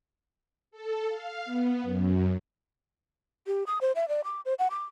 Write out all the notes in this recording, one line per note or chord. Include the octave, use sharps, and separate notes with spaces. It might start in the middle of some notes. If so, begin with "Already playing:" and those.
A4
F5
B3
F#2
G4
D#6
C5
E5
D5
D6
C5
F#5
D6